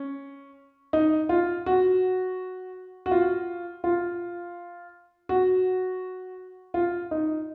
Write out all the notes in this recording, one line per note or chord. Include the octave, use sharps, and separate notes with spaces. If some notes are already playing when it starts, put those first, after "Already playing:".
Already playing: C#4
D#4
F4
F#4
F#4
F4
F4
F#4
F4
D#4